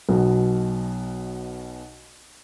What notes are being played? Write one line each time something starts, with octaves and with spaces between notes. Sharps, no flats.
B1 B2